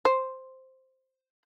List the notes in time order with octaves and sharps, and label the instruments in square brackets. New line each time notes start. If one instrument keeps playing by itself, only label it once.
[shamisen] C5